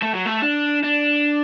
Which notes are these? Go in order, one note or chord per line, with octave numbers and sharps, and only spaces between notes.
A3
F#3
A3
D4
D4